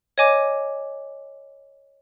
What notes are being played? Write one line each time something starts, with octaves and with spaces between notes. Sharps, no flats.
C#5 D#5 G#5 D6